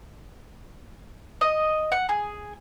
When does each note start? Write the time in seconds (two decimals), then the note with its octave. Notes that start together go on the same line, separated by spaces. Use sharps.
1.41 D#5
1.92 F#5
2.09 G#4